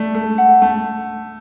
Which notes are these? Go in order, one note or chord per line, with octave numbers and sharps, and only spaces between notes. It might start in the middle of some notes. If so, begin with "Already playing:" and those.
Already playing: A3 D5
A3 A4
F#5
A3 A5